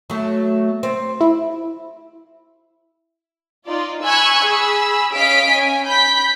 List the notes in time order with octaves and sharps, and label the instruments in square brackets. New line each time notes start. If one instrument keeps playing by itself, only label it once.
[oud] F#3 A3
C4
[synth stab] E4
[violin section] D#4 F4 D5
G#5 B5 C#6 E6 F#6 G#6
G#4 B5 E6
C#4 D#5 F5 B6 C7 D7
C#4 G#5
B5 G6 B6